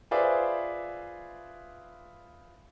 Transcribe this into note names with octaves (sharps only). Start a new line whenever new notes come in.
F4 G#4 B4 C5 D5 E5